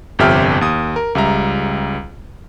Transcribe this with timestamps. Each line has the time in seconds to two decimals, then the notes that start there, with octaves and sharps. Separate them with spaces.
0.19 G1 F2 C3 G4 E5 F6
0.61 D#2 D#6
0.96 A#4
1.15 C#2 G3 E5 A#5